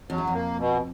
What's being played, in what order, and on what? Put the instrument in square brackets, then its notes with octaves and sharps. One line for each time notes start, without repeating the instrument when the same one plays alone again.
[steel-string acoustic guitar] F2 [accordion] F#3
[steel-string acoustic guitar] F#2
F2
[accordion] A#3
B2